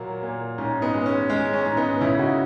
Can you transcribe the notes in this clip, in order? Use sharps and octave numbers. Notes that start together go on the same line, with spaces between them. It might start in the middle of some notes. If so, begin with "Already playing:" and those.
Already playing: A#2 F#3 A#3
A#2
G#2 C#4
B3 D#4
G#3
C#4
G#3 C#4
C#4
G#2
B3 D#4
C#3 C#4 E4
D#4 F#4